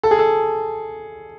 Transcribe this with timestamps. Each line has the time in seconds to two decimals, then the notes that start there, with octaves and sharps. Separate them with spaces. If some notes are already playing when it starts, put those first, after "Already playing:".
0.03 A4
0.11 G#4
0.19 A4